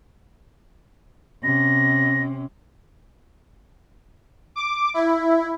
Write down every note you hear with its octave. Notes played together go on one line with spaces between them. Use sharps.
C3 C#4 A#6
D6
E4